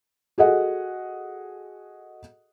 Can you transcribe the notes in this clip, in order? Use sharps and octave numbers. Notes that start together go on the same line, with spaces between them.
F#4 G#4 A4 D#5 F#5